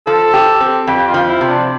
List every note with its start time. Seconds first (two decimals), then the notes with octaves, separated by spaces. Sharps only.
0.07 F3 A4
0.34 G4
0.61 C4
0.87 F2 G4
1.08 F4
1.14 F3
1.27 E4
1.41 C3
1.48 D4